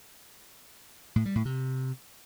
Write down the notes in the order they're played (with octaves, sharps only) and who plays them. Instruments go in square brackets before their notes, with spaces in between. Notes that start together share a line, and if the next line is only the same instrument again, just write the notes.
[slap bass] A2
G3
A2
C3